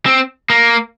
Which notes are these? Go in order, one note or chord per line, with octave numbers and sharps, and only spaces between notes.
C4
A#3